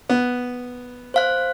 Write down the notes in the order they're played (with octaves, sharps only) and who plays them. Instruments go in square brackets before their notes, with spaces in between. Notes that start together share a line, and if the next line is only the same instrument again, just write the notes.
[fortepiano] B3
[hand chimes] C5 F5 F#6